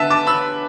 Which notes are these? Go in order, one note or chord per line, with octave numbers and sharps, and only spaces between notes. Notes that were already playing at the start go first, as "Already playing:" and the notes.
Already playing: D3 B3 B4 E5 A5
A5 D6
B5 E6